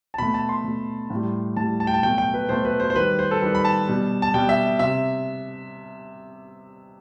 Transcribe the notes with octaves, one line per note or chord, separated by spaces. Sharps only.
A5
B2 A3 B5
A5
C6
B2 A3
A2 G3
A2 G3 A5
A5
G5
A5
B2 F#3 A3 G5
G5
B4
B2 F#3 A3 C5
B4
C5
C5
D#3 G3 B4
C5
A4
D#3 G3 B4
B5
A5
B2 G3
A5
B2 G3 G5
E5
C3 E5